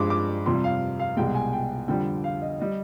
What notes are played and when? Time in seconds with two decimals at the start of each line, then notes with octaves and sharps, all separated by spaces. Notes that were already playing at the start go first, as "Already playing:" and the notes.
Already playing: G2 F3 G#3 D6
0.10 D6
0.46 F2 C3 G3 C6
0.64 F5
1.00 F5
1.17 C2 B2 G#3 G5
1.35 G#5
1.53 G5
1.88 F2 D3 G3 G5
2.24 F5
2.42 D#5
2.60 G3 D#5